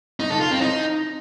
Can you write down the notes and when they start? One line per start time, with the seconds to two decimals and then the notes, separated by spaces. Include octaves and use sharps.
0.20 D#4
0.30 A4
0.41 F4
0.51 C4
0.61 D#4